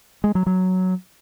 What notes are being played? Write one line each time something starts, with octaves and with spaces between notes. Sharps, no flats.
G#3
F#3
F#3